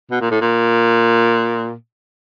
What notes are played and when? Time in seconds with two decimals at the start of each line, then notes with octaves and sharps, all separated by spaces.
0.10 B2
0.21 A#2
0.31 A2
0.41 A#2